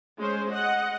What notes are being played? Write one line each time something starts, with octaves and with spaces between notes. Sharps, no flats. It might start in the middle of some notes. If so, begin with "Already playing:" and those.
G#3 C#4 C5
D#5 F#5